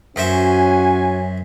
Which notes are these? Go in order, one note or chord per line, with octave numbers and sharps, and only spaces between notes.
F#2 C#4 F#4 C5 E5 G#5